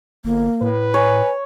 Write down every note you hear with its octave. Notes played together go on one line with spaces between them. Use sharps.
G1 A#3
A2 B4
C#5 G#5